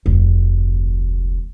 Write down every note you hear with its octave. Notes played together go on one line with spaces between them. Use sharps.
F1 D2